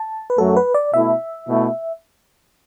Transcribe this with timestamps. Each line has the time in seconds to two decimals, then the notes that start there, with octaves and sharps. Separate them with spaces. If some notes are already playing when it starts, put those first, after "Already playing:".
Already playing: A5
0.30 B4
0.37 F#2 F#3 A3 F#4 A4
0.56 B4
0.74 D5
0.93 B2 A3 E4 A4 E5
1.48 B2 A3 E4